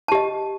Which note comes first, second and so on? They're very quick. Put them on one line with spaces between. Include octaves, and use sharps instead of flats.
A5 G4 D#5